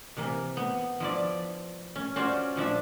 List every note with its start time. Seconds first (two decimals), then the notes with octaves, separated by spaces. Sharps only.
0.17 C3 E3 A#3
0.57 B3
1.00 F3 E4 D5
1.96 C#4
2.16 C#4 F4 F#4 C5 D5
2.56 A#2 F3 D4 E5